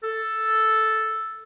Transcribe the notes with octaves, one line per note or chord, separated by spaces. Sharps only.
A4